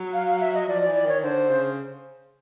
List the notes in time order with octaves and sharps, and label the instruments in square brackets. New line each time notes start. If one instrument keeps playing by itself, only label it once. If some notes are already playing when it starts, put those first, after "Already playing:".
Already playing: [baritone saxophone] F#3
[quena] F5
F5
E5
D#5
[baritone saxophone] F3 [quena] D5
[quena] D5
[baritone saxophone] E3
[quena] D5
[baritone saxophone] D#3 [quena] C#5
[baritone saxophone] D3 [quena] C5
[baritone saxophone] C#3